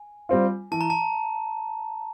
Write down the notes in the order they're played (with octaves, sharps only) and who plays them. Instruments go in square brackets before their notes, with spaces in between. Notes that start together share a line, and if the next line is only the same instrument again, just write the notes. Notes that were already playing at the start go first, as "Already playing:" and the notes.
Already playing: [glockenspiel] G#5
[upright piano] G3 C4 F4
[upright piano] E3 [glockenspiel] A5
[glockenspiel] A#5
A5